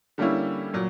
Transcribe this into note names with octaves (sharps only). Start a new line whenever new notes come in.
D3 G3 A#3 C#4 E4
A#2 F#3